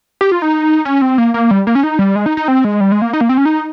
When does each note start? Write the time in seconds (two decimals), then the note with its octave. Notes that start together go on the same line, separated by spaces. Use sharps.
0.21 G4
0.32 F4
0.42 D#4
0.85 C#4
1.02 C4
1.18 A#3
1.34 A#3
1.51 G3
1.67 A#3
1.75 C#4
1.83 D#4
1.99 G3
2.16 G#3
2.26 D#4
2.37 D#4
2.48 C4
2.64 G#3
2.81 G3
2.92 G#3
3.02 A#3
3.13 D#4
3.21 A#3
3.29 C4
3.37 C#4
3.45 D#4